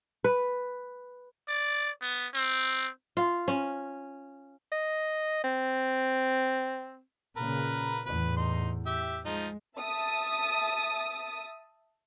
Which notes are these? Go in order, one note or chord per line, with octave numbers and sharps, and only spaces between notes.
B4
D5
B3
C4
F4
C#4
D#5
C4
A#2 C#3 A#4 B4
E2 A2 B4
D#4 C6
G4 E5
F3 G#3 D#4
E5 A5 D#6